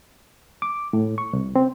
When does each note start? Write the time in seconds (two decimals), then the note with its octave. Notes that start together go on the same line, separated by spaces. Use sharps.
0.62 D6
0.93 A2
1.18 C#6
1.33 C2
1.56 C4